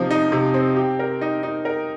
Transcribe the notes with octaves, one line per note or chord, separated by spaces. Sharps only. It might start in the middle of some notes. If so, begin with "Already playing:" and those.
Already playing: C3 F3 D#4
D#4
C3
C4
G4
A#4
D#4
D#4
A#4